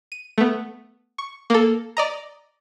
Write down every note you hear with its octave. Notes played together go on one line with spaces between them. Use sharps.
D#7
A3 B3
C#6
A#3 A4
D5 D#5 A#5